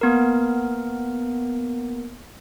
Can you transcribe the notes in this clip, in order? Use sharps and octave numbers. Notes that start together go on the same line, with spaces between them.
A#3 B3 A#4